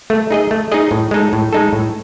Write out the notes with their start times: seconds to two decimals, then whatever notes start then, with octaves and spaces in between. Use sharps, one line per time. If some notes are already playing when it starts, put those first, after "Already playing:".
0.10 A3
0.31 D#4 G#4 D#5
0.51 A3
0.72 D#4 G#4 D#5
0.91 A2
1.11 G#3 D#4 A4
1.33 A2
1.53 G#3 D#4 A4
1.73 A2